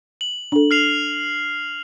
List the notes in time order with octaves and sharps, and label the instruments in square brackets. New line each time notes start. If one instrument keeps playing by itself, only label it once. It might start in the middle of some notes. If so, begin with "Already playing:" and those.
[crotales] F#7
[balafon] D4 A4
[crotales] F6 C7 F7